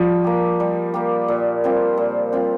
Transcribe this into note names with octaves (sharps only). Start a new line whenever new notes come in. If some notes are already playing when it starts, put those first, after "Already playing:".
Already playing: F3 G3
A#3 G4
G3
A#3 G4
A#2
G3 C4 F4
A#2
G3 C4 F4